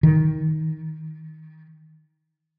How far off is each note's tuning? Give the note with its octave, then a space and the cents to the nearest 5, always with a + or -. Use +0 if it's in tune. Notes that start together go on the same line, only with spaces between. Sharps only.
D#3 +20